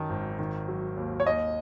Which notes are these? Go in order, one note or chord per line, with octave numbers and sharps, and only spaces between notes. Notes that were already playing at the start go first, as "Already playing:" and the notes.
Already playing: F#2 D#3 A5
G#1
D#3
F#3
D#2
C#5
D#2 D#5